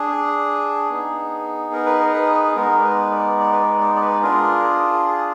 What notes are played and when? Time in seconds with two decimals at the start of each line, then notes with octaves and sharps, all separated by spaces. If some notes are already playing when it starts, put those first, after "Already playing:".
Already playing: D4 G#4
0.90 B3 D#4 G#4
1.73 A#4
1.86 B4
1.99 A#4
2.14 B4
2.56 G#3 B3 D#4 A#4
2.77 D5
2.84 B4
3.11 D5
3.39 D5
3.52 B4
3.61 D5
3.81 D5
3.95 D5
4.01 B4
4.22 D4 F4 G#4 A#4
4.64 G#4
5.06 G#4